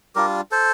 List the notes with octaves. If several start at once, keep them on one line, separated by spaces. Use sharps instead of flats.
G3 D4 F4 G4 A#4
A4 C5